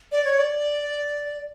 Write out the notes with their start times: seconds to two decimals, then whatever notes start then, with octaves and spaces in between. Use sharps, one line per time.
0.12 D5
0.25 C#5
0.38 D5